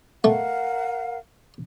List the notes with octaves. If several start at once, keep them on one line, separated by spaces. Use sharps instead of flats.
A3 A#4 F5 F#5